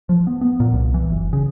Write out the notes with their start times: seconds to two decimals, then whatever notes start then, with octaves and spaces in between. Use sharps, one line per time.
0.09 F3
0.27 B3
0.41 B3
0.60 A#2
0.73 C2
0.94 E3
1.10 F#1
1.33 C#3